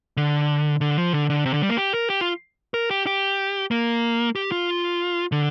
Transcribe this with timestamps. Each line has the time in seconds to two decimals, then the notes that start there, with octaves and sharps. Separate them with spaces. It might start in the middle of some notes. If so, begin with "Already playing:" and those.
0.17 D3
0.81 D3
0.97 F3
1.13 D3
1.30 D3
1.46 C3
1.54 D3
1.62 G3
1.70 A#3
1.78 G4
1.94 A#4
2.10 G4
2.21 F4
2.74 A#4
2.91 G4
3.06 G4
3.71 A#3
4.35 G4
4.52 F4
5.32 D3